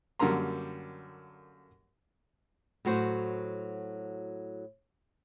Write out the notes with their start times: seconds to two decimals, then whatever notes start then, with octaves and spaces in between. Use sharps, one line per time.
0.19 F#2 D3 G3 A#3 A#5 C6
2.85 A2 F#3 F#4 C5